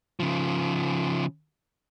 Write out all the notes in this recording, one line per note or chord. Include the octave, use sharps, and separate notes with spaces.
C#3 F3